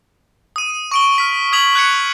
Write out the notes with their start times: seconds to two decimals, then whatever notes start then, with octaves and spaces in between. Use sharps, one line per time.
0.56 D#6 D#7
0.92 C#6 D7 G7
1.16 F6 B6 G7
1.52 D#6 G#6 B6 F7 F#7
1.75 F#6 G#6 C#7